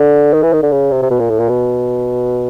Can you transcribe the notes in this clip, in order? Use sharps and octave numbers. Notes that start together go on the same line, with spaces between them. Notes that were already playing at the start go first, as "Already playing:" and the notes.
Already playing: D3
D#3
E3
D#3
D3
C#3
C3
C3
B2
A#2
A2
A#2
B2